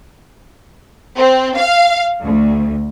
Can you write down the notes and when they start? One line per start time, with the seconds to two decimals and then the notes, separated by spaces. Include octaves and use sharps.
1.17 C4
1.57 F5
2.23 D2